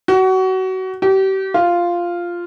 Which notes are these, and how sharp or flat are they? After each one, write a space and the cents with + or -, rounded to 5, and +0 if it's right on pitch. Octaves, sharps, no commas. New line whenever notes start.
F#4 +25
G4 -35
F4 -5